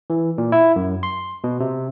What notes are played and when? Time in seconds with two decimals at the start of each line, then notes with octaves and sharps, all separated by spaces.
0.10 E3
0.38 A#2
0.52 E4
0.76 F#2
1.03 C6
1.44 B2
1.60 C3